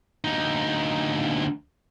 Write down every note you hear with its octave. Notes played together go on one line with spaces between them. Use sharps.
D2 D#4